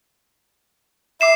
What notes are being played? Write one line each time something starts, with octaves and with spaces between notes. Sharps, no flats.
E5 D6 C7 E7